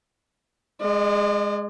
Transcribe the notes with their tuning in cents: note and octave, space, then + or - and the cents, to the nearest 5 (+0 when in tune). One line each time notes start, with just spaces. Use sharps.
G#3 -5 D5 +45